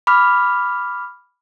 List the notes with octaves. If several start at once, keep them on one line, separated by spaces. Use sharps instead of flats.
B5 D6 F6